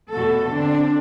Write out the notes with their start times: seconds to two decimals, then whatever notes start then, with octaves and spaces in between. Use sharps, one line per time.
0.10 E2 B2 A3 F#4 A4
0.50 D3 C4 D4